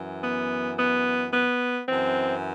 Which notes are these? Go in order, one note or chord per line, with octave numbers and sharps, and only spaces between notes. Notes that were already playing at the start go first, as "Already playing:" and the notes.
Already playing: F#2 E3
B3
B3
B3
F#2 E3 C4